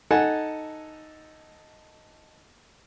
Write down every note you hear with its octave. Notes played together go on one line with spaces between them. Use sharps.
D#4 A4 F#5 G#5 A5